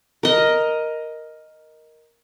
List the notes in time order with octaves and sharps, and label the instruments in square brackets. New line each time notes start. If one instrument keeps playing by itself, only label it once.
[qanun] A#4 D#5